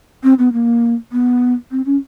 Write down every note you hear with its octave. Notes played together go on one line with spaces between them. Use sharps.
C4
B3
A#3
B3
C4
C#4